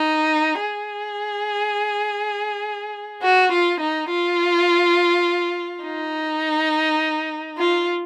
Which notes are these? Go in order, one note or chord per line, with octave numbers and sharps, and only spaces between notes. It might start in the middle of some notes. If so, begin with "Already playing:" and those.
Already playing: D#4
G#4
F#4
F4
D#4
F4
D#4
F4